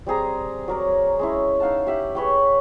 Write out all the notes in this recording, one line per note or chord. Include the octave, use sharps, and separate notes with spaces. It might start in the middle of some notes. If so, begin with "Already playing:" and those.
G3 C4 G#4 A#5
F#3 A#4 D5
G#3 C#4 E4
D#4 F5 F#5 A5
G4 E5 F#5
G#4 B4 C#5 G5